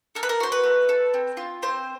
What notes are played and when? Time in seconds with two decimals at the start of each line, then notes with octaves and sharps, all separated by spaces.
0.15 A4 A#4
0.23 B4
0.29 A#4
0.40 F#4 C5
0.52 B4
0.64 A3
0.89 A4
1.14 C4
1.37 F4
1.63 C4 C5